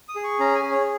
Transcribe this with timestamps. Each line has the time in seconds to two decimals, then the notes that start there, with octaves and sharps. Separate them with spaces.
0.09 D#6
0.16 G#4
0.24 C#6
0.39 C#4 A#5
0.55 G#5
0.63 G#4
0.72 C#5